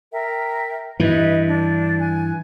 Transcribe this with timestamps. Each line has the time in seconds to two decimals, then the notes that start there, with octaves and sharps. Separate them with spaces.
0.12 A#4 E5 G5
1.00 G2 E3 B4 D#5 E5
1.48 D4
1.99 G#5 F#6